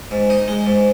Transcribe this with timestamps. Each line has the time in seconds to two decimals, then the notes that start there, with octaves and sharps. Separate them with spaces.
0.11 G#2
0.30 D#4
0.48 G#3
0.66 G#2